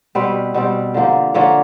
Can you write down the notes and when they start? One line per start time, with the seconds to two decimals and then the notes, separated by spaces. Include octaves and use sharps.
0.15 B2 G3 C4 B4
0.54 B2 G3 C4
0.94 D3 F3 A#3
1.34 D3 F3 A#3 C#5